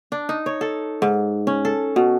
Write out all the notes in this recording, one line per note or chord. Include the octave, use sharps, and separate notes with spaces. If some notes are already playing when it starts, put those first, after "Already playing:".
D4
D#4
C#5
A4
G#2
C#4
A4
B2